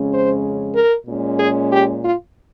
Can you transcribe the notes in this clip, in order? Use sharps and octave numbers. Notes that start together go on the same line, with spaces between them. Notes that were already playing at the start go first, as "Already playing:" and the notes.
Already playing: F2 C#3 G#3 C#4
C5
A#4
A#2 G#3 C#4
G#4
G4
F4